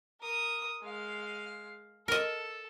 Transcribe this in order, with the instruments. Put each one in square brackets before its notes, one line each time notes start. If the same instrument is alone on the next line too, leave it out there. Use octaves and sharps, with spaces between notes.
[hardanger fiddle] A#4 D#6
G#3 F5
[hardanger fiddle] A4 [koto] A#4 D#5